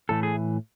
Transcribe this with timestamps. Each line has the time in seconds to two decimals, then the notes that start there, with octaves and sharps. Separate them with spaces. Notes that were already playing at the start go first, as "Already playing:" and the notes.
0.09 A2 E3 A3 A4
0.23 G#4